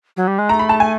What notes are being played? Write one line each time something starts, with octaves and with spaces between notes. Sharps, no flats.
F#3
G3
G#3
A3 A#5
B5
A5
G#5